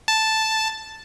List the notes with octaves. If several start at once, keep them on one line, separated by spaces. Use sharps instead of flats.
A5